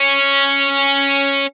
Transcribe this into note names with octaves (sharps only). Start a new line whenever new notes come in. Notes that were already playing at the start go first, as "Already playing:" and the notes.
Already playing: C#4